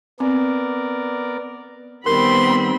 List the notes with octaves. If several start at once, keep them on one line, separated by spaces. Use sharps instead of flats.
B3 C4 A#4 D5
D#3 G3 B3 C4 A#4 B5 C6